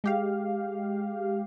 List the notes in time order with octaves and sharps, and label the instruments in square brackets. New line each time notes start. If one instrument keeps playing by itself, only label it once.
[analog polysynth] G#3 G4 F5